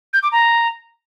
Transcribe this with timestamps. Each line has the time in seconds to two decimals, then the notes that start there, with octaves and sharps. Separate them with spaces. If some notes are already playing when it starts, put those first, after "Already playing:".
0.13 G6
0.22 D6
0.32 A#5